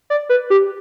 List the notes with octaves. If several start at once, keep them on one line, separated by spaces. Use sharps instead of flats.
D5
B4
G4